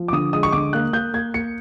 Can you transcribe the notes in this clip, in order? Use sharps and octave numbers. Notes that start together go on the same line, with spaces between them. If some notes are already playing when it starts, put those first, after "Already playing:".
Already playing: F3
D6
D3 D#6
G#3 D#6
C#6
D3 D6
A#3 F#6
A#3 G6
A#3 G#6
A#3 C#7